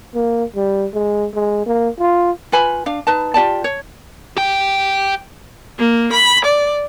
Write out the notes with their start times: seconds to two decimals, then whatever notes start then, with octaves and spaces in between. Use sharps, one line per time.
0.15 A#3
0.56 G3
0.94 G#3
1.34 G#3
1.66 A#3
1.99 F4
2.52 F4 B4 G#5 B5
2.86 D4 F5
3.07 D#4 B4 A5
3.34 F4 G4 D5 A5
3.64 C#5
4.37 G4 G5
5.79 A#3
6.13 B5
6.46 D5